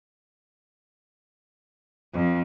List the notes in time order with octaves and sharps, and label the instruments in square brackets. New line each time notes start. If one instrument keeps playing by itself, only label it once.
[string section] F2